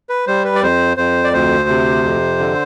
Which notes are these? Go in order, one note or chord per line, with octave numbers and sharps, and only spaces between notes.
B4
G3 C5
B4
D5
F2 C5
F2 C5
D5
D2 C5
C3
F2
D3